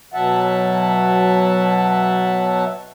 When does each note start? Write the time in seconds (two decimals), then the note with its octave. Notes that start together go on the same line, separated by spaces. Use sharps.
0.14 B2 F#3 E5 F#5 A5